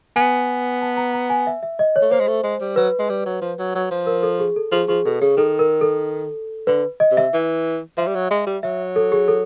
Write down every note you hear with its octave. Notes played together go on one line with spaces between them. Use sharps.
B3 G#5
A5
A#5
A#5
G#5
E5
E5
D#5
C#5
A3
A#3 C5
G#3
A3
G#3
G3
F#3 B4
G#3
G3
F#3
F3
F#3
F#3
F3
A#4
A4
G#4
A4
F3 G#4
F3 G#4
B2 A4
C#3 G#4
D#3 A4
A#4
A4
D3 B4
D#5
C3
E5
E3
F3 E5
G3
F#3
G#3
G3
F#3 E5
A4
G#4
A4